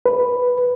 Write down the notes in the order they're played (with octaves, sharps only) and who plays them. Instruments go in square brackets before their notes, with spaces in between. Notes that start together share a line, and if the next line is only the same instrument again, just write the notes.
[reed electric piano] B4